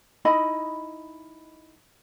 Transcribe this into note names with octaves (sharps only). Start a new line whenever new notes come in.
D#4 E4 D#5 B5